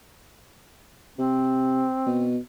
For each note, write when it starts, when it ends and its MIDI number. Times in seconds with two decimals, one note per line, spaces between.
1.18 1.85 48
1.18 2.35 60
2.06 2.37 47